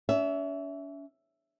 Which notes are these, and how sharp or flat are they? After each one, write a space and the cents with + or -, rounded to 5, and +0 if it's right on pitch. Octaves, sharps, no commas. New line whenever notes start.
C#4 +45 E5 +0